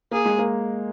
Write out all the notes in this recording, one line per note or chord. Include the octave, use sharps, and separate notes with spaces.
A#3 G#4
G#3
A#3